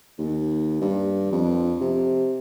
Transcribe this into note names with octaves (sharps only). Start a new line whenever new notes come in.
D#2
G2
F2
C3